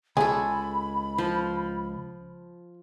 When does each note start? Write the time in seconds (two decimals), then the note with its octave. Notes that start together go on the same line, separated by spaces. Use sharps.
0.17 C#2 G#4 A4 G#5 B5
1.18 F3